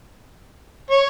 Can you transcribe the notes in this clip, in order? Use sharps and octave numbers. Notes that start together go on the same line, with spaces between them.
C#5